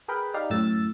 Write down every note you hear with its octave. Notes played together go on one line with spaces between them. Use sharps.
G#4 A#4 B4 G5 B5
D#4 G4 D5 F5
F#2 A2 E6 A6